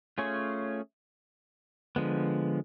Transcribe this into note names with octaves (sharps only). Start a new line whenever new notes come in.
A3 C#4 F4 G#4 C#5
D3 F3 G#3 B3